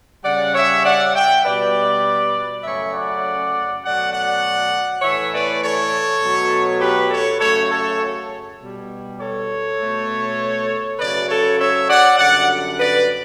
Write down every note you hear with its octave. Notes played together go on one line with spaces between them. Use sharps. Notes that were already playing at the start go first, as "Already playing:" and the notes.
C#3 G3 D5 F#5
C#5 E5
D5 F#5
E5 G5
B2 G3 B4 D5
F#2 C#3 F#3 A3 C#5 E5
D5 F#5
B2 F#3 A3 D5 F#5
D5 F#5
A2 E3 A3 C#5 E5
B4 D5
A4 C#5
B2 F#3 A3
G4 B4
A4 C#5
F#2 C#3 F#3 A3 A4 C#5
A4 C#5
B2 G3
A4 C#5
B2 A3
C#3 F#3 A3 B4 D5
A4 C#5
C#5 E5
D5 F#5
F#2 D3 G3 D5 F#5
B4 D5